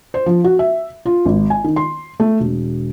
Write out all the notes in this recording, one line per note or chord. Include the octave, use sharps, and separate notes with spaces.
C5
F3
F#4
E5
F4
G#1
G#5
D#3
C6
A3
E1